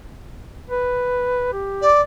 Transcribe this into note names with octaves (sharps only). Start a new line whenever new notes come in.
B4
G4
D5